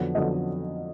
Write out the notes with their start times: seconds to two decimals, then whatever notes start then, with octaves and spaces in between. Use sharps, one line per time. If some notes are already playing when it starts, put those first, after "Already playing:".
Already playing: F2 D3 F#3 B3
0.15 F2 D3 F#3 B3 D#5